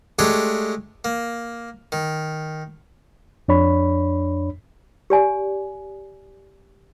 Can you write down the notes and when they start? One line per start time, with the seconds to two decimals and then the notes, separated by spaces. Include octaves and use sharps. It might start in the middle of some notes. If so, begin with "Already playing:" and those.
0.19 G#3 A3 D4 G4 G#4 C#5
1.05 A#3
1.92 D#3
3.48 F2 D4 C#5 B5
5.10 G4 D5 G#5